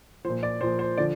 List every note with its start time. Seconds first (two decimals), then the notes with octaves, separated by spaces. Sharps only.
0.25 F3 C5
0.29 A#2
0.43 D5
0.61 A#2 F3 C5
0.79 C5
0.97 D3 F3 D5